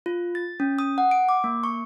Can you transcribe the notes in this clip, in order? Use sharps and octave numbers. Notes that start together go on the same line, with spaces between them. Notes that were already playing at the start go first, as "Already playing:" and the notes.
F4
A6
C#4
D#6
F#5
D7
D6
A#3
C#6